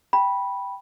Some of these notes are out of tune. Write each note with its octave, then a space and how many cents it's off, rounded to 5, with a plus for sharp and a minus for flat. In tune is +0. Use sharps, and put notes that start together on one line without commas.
G5 +0 B5 -10